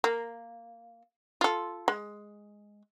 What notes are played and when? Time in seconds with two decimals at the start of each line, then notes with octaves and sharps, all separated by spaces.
0.04 A#3
1.41 F4 A4
1.88 G#3